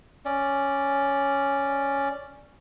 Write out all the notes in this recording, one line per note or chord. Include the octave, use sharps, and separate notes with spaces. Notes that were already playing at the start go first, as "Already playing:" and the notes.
C#4 D5